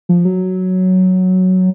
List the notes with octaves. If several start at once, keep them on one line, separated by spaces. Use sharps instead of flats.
F3
F#3